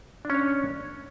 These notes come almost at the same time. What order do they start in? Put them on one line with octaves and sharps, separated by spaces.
D4 C#4 C#5